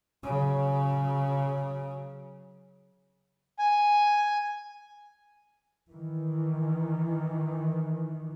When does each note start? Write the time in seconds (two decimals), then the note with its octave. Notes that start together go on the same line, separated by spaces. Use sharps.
0.23 C#3 F#3
3.59 G#5
5.89 D#3 E3